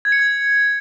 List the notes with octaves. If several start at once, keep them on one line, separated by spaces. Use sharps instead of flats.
G#6
C#7
G#6